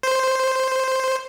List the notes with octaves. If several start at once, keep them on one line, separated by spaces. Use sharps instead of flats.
C5